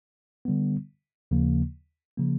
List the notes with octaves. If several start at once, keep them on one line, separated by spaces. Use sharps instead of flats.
D3 G3 B3
D#2 C#3 F3 A#3
C#3 F3 A#3